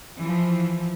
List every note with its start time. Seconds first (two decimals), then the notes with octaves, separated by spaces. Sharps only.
0.20 E3 F3